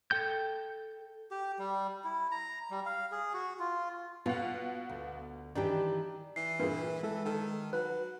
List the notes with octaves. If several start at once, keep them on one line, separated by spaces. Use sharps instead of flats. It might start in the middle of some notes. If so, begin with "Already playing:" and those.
A4 G5 G6
G4
G3
E4
A#5
G3
F5
G#4
F#4
F4
B2 F4 F5 F#5
D2
D#3 E3 D4 G4
E3 C7
G2 A#2 G#4 B4
E3 G#3 A4
D#3 A4
F#3 B4 F#6